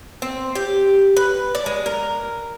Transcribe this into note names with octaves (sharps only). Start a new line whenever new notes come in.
C4
G4
B4
D5
G#3
A#4